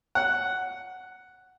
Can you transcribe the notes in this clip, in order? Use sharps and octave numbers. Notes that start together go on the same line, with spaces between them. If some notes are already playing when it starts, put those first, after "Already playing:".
F#5